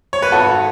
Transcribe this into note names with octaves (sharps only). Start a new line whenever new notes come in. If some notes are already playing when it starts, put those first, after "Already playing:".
C#5
B4
G#1 F#4 A4